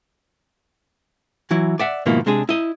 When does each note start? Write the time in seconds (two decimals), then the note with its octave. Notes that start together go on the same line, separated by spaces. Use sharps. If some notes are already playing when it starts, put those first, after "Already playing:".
1.51 E3 F#3 E4
1.79 D5 E5 F#5
2.06 G#2 B2 D#3 F3 A#3 E4
2.26 C3 G#3 D4 G#4
2.49 E4 D#5